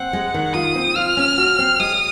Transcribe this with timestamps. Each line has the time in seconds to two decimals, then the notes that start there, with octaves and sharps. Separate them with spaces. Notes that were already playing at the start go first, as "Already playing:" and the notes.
Already playing: C4 F#5
0.13 G#3
0.34 D#3
0.54 F4 D#6
0.75 C4
0.96 F4 F6
1.17 C#4
1.38 F#4
1.59 C4
1.80 G#3 D#6